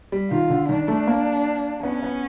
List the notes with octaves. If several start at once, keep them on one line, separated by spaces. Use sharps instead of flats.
G3
D#3 F4
D3
D#3 D4
A3
A#3
B3 C#4
B3